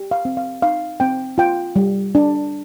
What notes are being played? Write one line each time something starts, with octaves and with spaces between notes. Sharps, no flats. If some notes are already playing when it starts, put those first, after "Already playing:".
Already playing: G4
F5
C4
F5
D#4 F5
C4 G5
F4 G5
G3
D4